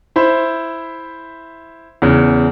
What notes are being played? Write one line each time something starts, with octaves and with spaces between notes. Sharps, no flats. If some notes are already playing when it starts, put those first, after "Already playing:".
E4 C5 E5 B5
E2 C#3